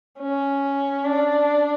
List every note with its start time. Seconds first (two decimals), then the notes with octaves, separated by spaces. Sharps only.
0.20 C#4
1.04 D4